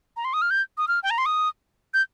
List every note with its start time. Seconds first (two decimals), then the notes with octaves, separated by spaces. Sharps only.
0.17 A#5
0.25 C6
0.33 D#6
0.42 F6
0.50 G6
0.78 D#6
0.88 F6
1.03 G5
1.10 A#5
1.18 C6
1.26 D#6
1.94 G6